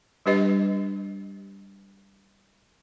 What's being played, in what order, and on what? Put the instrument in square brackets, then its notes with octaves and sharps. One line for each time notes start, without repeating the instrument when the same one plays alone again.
[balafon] G3 D4 G4 B4 D#5